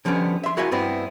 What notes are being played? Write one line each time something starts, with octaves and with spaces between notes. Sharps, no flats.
D3 F3 G3 B3 C#4
E5 C6
E4 F#4 A#4 E5 F5 G#5
G2 B3 C4 E4